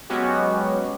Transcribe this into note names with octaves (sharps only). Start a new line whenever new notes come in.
F#3 G#3 B3 C#4 F#4 G4